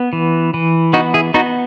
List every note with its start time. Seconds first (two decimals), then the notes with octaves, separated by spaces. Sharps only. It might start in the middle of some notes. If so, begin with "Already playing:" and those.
Already playing: B3
0.13 E3
0.54 E3
0.93 B3 D#4 F#4
1.14 E4 G#4
1.34 B3 D#4 F#4